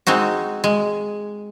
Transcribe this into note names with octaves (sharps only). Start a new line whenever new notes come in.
G#3 C4 D#4 F#4
G#3